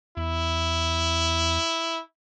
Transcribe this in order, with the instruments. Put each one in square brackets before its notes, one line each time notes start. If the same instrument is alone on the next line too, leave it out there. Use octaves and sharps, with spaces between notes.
[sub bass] E2 [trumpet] E4